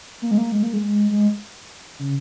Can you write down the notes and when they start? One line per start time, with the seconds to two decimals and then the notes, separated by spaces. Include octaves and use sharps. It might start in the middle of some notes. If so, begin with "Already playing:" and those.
0.22 A#3
0.31 G#3
0.38 A#3
0.52 G#3
0.63 A#3
0.73 G#3
1.11 G#3
1.99 C#3